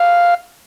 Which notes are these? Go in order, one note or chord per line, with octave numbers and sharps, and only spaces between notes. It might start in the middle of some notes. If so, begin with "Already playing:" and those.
Already playing: F5